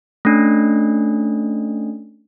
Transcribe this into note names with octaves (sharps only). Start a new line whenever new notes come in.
A3 C#4 D4